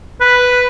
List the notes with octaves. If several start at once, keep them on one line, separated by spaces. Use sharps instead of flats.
B4